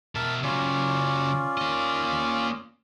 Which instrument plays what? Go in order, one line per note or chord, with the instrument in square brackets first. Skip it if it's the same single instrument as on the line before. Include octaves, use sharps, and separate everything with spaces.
[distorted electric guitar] B2 E5 [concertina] A#4 A5
[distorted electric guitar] C#3 F#3 [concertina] C#4 F4 D5
[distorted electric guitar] A#3 D#5